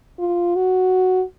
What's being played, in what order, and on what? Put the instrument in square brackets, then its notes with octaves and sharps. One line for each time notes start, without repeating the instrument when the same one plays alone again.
[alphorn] F4
F#4